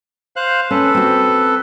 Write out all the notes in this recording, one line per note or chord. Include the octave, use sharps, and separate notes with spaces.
C5 F5 F#6
C#4 A4 B4
C4 F#4